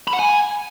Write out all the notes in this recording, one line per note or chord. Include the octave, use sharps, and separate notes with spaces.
B5
F#5
G#5